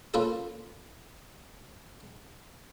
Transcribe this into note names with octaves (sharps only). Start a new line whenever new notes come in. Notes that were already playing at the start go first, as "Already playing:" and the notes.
A#3 C#4 F4 A4 B4 C5